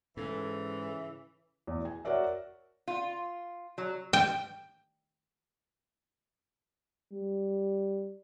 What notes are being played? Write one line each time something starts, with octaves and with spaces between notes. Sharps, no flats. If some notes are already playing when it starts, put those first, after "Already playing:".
G#2 C#3 E3 A4
E2
G#5
F#4 A#4 C#5 D5 E5
F4
F#3
G5
G3